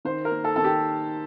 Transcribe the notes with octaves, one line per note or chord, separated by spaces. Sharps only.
D#3 C5
A#4
A#3
A4
D#3 A4
G4